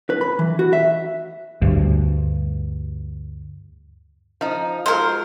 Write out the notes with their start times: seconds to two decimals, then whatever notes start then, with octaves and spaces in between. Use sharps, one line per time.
0.10 B4
0.21 B5
0.39 E3
0.59 F#4
0.73 E5
1.62 D2 G2
4.41 F3 D#4
4.86 F#3 G#3 F4 A#4 C5